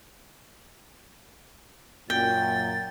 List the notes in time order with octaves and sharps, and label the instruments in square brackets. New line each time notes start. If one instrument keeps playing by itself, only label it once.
[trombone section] F#2 A#2 [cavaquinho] G5 [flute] A6